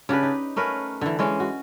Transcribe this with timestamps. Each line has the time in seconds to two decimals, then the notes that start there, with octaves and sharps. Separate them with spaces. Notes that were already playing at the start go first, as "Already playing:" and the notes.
0.09 C#3 D4 G4 B4
0.23 D#4
0.56 A3 C#4 A#4 B4
1.01 D3 E3
1.19 E3 G#3 C#4
1.40 F#4